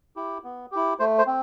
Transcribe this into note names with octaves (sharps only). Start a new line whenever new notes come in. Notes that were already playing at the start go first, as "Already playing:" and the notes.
E4 G4
B3
E4 G4
A3 C5
C5
C4